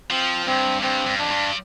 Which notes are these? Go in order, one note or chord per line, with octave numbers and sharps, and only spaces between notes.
F3 C4
G2 C4
G2 C4
G2
F2 D4
G2